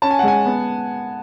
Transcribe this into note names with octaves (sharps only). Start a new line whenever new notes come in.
C#4 A5
G#5
F#5
G#3 G#5
B3